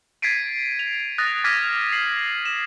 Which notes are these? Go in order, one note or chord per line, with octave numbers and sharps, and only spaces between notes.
G#6 A6 B6 C7 D7 D#7
F7
D#6 F#6 A6 A#6
D6 F6 G#6 A#6 B6 D#7
C7 F#7
E7